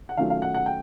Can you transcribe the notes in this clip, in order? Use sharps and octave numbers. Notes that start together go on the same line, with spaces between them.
F#5
D#3 F#3 A3 C#4 F4 F5
F5
F#5
F#5
G5